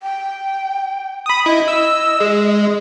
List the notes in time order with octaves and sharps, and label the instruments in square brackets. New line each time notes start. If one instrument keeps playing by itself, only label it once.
[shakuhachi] G5
[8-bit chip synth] B5 D#6
[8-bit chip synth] E4 [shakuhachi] D#5
[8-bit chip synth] E6
G#3